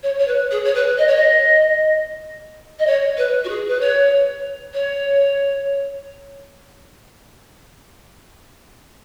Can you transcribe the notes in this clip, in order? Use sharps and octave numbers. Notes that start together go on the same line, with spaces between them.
C#5
C#5
B4
G#4
C#5
B4
D#5
C#5
D#5
D#5
C#5
B4
F#4
G#4
B4
C#5
C#5